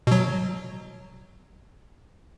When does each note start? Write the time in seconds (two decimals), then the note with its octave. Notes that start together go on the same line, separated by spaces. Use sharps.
0.07 B2 F#3